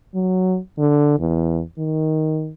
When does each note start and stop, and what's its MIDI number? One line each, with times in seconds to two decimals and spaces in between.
0.15 0.58 54
0.79 1.17 50
1.19 1.61 40
1.78 2.51 51